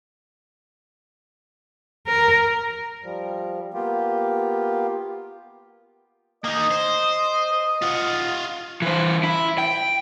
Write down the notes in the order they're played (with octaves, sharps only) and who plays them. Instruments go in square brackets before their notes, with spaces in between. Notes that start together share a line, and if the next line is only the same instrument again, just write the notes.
[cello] A#4
[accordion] F3 G3
A#3 B3 F4 G4
[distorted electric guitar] A#3 D#4 [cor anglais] D#5
[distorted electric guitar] C5
F4 F#5
[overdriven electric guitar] E3 C5
E4
G5